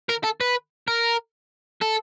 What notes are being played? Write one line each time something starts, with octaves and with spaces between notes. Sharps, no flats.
A#4
A4
B4
A#4
A4